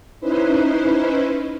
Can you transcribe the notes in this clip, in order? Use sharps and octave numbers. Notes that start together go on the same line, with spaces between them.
C#4 D#4 E4 B4 C5